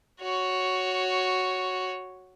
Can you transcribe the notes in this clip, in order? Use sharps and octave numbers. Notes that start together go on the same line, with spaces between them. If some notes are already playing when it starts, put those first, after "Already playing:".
F#4 C#5